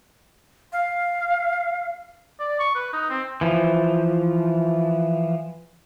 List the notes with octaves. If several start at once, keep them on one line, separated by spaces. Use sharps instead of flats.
F5
D5
C#6
B4
D#4
C4
E3 F3